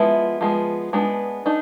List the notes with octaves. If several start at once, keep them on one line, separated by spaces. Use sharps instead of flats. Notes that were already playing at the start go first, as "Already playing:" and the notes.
Already playing: F3 G#3 B3 E4
F3 G#3 B3
G#3 B3 D4
D4 D#4